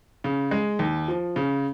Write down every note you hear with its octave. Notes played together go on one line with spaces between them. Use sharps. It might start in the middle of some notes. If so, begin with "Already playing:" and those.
C#3
G#3
D#2
F3
C#3